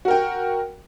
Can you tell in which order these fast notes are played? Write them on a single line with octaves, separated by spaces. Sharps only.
F#4 A#4 G5